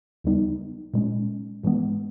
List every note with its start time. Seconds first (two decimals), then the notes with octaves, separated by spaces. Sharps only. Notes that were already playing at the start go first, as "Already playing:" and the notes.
0.24 D#2 C#3 G3 B3 D#4
0.94 A#2 G#3 C#4
1.63 G#2 E3 G#3 B3